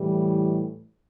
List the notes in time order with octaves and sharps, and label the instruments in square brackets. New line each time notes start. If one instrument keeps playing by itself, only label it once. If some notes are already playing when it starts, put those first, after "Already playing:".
Already playing: [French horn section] A2 E3 G3